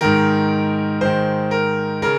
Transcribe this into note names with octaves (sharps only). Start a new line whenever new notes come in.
G#2 D#3 A#4
G#2 D#3 C5
A#4
C#3 A#4